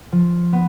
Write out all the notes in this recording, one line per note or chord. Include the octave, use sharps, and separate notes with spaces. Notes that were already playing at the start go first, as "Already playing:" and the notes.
F3
B3